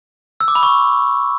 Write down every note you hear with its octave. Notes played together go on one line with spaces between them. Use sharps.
E6
D6
B5
C#6